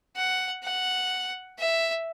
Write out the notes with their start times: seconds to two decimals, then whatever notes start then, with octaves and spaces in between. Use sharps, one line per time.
0.16 F#5
0.64 F#5
1.59 E5